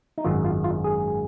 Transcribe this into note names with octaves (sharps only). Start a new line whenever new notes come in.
D#4
G#1 F#2 D#3 F4
F4
F4
G#4